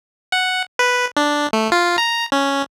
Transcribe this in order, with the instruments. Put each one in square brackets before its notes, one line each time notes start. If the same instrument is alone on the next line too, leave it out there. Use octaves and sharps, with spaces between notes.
[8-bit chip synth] F#5
B4
D4
A3
F4
A#5
C#4